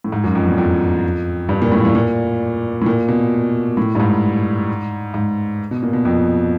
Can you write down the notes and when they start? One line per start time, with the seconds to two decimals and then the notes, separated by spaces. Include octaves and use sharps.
0.04 A2
0.12 G#2
0.24 F#2
0.35 F2
0.46 E2
0.58 F2
1.49 G2
1.62 A#2
1.72 A2
1.85 A2
1.95 A#2
2.82 A2
2.86 A#2
3.08 B2
3.77 A2
3.95 G2
4.00 G#2
5.14 G#2
5.71 B2
5.83 A#2
5.93 B2
6.05 F2